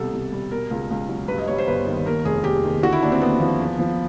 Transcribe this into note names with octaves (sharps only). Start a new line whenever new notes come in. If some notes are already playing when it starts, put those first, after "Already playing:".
Already playing: C2 B2 A4
C2
G3
B2 A#4
C#2
C#2
F#3
G2 B4
D#5
G3 C#5
C5
G1 B4
D#3
D#2 A#4
F1 G#4
F1 G4
D#3
D3 F#4
E4
D#2 D4
C4
D#2 B3
F3
E2
F3